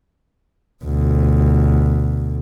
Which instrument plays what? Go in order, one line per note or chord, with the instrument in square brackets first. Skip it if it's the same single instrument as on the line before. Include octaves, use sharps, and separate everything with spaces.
[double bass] D2 B2